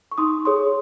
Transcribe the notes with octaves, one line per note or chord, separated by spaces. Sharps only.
C#6
D#4 C6 D#6
G#4 C#5 C6 D#6